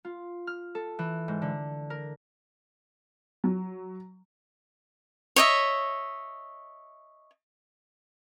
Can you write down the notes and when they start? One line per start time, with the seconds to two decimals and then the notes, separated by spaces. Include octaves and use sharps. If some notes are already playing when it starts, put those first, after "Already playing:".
0.05 F4
0.47 F6
0.75 A4
0.99 E3
1.28 G#2
1.42 D3
1.90 A#4
3.44 F#3
5.36 C#5 D#5 E5